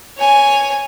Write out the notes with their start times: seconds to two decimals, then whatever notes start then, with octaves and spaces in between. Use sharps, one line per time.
0.18 C#5 G#5